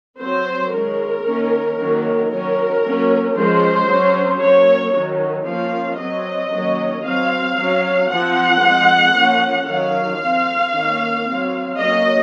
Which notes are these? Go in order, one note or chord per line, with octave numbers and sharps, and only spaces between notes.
F#3 C4 C5
D#3 G#3 C#4 A#4
D#3 A#3 C#4
D#3 F#3 A#3 C#4
D#3 F#3 C#4 A#4
F#3 A#3 C#4
F3 G#3 C#4 C5
F#3 C#4
F#3 A#3 C#4 C#5
D#3 F#3 C#4
F3 A#3 C#4 F5
F#3 C4 D#5
D#3 F#3 A#3 C#4
F#3 C4 F5
F#3 C#4
F3 C4 F#5
F3 G#3 C4
F3 A#3 C#4
D#3 F#3 C#4 F5
F3 C4
D#3 A#3 C#4
F#3 C4
F#3 A#3 C#4 D#5